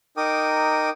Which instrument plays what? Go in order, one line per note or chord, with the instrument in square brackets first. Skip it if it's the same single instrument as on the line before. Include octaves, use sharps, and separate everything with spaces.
[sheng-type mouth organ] D#4 A#4 G5 D6 D#6